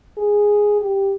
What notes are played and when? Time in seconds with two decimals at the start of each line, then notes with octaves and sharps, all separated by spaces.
0.18 G#4
0.81 G4